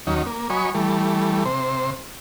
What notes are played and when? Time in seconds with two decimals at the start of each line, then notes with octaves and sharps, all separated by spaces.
0.07 D#2 F#3 C#4 D#4
0.26 A#3
0.50 F#3 C#5 D#5 G#5 B5 C#6
0.75 E3 G3 A3
1.45 C3 C5